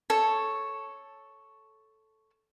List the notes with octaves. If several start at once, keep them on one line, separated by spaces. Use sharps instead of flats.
A4 C#5